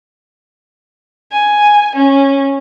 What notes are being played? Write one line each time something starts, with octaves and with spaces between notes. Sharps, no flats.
G#5
C#4